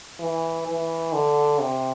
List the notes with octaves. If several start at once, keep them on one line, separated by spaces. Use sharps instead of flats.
E3
E3
D3
C3